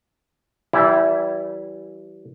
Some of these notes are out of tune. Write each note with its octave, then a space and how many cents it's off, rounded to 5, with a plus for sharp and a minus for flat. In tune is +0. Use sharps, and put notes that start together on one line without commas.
E3 +0 G3 -30 E4 +0